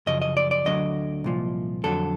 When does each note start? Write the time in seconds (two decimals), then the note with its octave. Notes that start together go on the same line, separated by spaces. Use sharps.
0.06 F#2 C#3 F3 D#5
0.22 D#5
0.37 D5
0.51 D5
0.65 D2 D3 F#3 D#5
1.24 C2 A#2 F3
1.84 F2 D3 F#3 A4